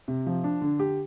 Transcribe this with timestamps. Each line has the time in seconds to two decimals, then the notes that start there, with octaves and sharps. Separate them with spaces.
0.08 C3
0.27 F3
0.44 D4
0.61 D3
0.79 G4